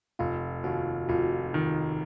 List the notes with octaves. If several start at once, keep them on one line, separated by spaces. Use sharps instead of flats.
F1 F4
D#2 F#4
F1 F4
D#3